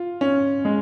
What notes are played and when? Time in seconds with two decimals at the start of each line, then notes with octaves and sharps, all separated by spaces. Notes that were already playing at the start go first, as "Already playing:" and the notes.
Already playing: F4
0.21 C#4
0.65 G#3